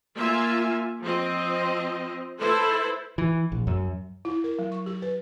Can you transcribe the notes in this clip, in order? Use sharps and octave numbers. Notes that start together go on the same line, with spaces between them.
A#3 F4 E5 G#5
F3 C4 D#5
E4 A4 B4 C5
E3
A#1
F#2
E4
A#4
F#3
C#6
G4
B4